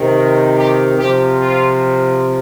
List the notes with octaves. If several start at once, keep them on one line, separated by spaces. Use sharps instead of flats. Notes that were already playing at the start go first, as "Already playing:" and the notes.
Already playing: C3 D#3
G4
C3 F3 G4
F4